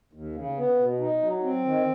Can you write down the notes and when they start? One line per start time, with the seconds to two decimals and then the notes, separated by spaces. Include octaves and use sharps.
0.13 D#2
0.35 C#3
0.57 B3
0.79 B2
1.00 D#4
1.22 F#3
1.43 C4
1.65 D#3